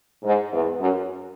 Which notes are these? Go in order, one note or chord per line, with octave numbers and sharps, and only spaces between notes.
G#2
E2
F#2